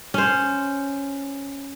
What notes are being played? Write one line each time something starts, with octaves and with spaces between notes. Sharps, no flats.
C#4 C5